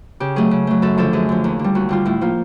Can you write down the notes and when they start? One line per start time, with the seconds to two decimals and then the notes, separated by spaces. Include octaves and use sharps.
0.20 C#3 G4
0.36 F#3 A3 G#4
0.51 C#3
0.67 F#3 A3
0.82 F#2 A4
0.97 D3 F3 A4
1.13 F#2 G#4
1.29 D3 F3
1.44 D#2
1.59 D3
1.64 G3
1.75 D#2 F#4
1.89 D3 G3 F4
2.05 A2 E4
2.21 F3 A#3 F4